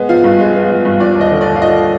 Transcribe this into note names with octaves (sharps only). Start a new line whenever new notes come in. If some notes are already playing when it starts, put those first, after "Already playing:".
Already playing: G#3 B3
F3 F5
G2
G#3
B3
F3
G2
F3 D5
D#2
D#5
D3
D5
D#2
F5
F3 D#5